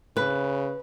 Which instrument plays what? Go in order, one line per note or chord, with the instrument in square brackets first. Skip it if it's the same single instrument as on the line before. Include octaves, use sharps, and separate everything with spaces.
[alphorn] C#3 [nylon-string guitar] B4